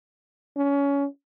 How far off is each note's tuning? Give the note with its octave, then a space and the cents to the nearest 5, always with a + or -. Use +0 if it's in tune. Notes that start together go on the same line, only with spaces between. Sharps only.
C#4 +25